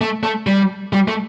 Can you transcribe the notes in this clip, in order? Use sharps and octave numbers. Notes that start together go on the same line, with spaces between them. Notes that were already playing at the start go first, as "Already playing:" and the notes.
A3
A3
G3
G3
A3